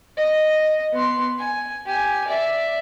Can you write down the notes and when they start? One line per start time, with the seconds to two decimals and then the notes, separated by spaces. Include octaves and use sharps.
0.17 D#5
0.93 B3 C6
1.39 G#5
1.86 G4 G#5
2.27 D5 E5